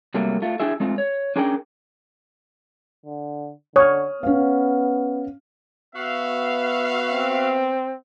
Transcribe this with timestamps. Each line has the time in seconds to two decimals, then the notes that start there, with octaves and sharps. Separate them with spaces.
0.14 C3 F#3 G3 A3 A#3
0.42 A3 F4
0.60 D4 E4 G4 G#4 E5
0.80 G#3 A3 C4 F4
0.98 C#5
1.36 C#4 D4 G#4 A#4 D5 G5
3.06 D3
3.76 D3 C#5 D#6 F6
4.23 B3 C#4 F5
5.95 B3 F#4 E5 F5
7.12 C4